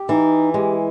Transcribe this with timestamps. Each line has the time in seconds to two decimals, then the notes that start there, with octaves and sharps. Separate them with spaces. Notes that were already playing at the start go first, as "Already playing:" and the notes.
Already playing: G4
0.09 E3 D#4
0.54 G#3 G4